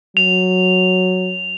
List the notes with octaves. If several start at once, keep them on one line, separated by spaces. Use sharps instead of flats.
F#3 F7